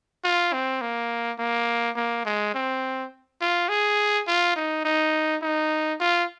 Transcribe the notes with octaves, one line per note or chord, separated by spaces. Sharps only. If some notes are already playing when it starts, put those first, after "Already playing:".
F4
C4
A#3
A#3
A#3
G#3
C4
F4
G#4
F4
D#4
D#4
D#4
F4